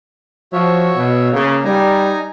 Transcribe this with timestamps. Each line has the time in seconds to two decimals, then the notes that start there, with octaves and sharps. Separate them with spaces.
0.53 F3 F#4 C#5 E5
0.96 B2
1.33 C#3 A#3
1.65 G3 D#4 G#5 A#5